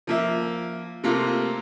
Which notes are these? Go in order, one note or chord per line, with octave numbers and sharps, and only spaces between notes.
F3 A#3 E5
C3 A3 A#3 F4